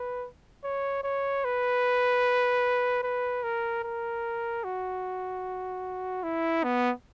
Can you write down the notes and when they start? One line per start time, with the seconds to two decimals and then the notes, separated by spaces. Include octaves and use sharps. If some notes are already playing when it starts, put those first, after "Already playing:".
Already playing: B4
0.64 C#5
1.03 C#5
1.44 B4
3.03 B4
3.43 A#4
3.84 A#4
4.64 F#4
6.23 E4
6.64 B3